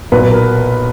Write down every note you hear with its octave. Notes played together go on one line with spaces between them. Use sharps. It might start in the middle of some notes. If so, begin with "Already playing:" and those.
B1 A#2 B4
A#4